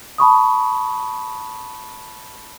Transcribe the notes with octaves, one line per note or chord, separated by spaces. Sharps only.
A5 B5 C#6 D#6